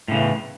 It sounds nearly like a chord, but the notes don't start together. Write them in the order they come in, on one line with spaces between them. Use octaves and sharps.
A2 C#3 E3